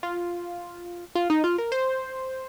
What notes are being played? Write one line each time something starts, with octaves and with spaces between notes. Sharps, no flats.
F4
F4
D#4
F4
A#4
C5